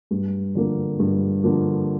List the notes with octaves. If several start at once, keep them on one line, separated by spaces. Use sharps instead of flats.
G2
D3 F3 A#3
G2
D3 F3 A#3